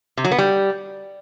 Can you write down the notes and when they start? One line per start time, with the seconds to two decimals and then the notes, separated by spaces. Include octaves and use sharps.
0.17 C3
0.24 F#3
0.31 B3
0.38 G3